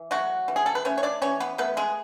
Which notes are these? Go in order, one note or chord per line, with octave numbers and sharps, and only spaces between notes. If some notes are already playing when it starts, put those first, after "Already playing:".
Already playing: E3
F#3 A3 F#4
E3
G#4
A4
B4
A3 C#4 C#5
C#5
D4 D5
E3 C#4 C#5
B3 B4
A3 B3 B4
G#3 G#4